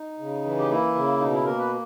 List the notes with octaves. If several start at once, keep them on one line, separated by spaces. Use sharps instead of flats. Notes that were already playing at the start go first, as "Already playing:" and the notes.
Already playing: D#4
C#3
E3
G4
A#3 E4
C#3
B2 D#4
E4
A#3 A#4
B4